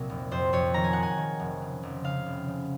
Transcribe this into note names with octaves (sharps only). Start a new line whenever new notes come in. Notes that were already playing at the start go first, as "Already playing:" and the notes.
Already playing: C2 A#2 F#3
F1
F2 C5
F2 C#5
D#3 A#5
G#5
G#3 F#5
G#5
D#3
F1
C#3
F1
C#3 F5
F1
C#3